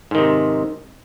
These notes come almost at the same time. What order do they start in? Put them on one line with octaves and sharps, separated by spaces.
G#2 D#3 C3